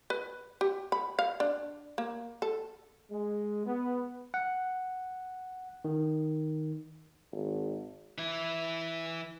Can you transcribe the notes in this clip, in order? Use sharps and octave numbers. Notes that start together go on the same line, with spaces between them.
B4
G4
B5
F5
D4
A#3
A4
G#3
B3
F#5
D#3
G#1
E3 E4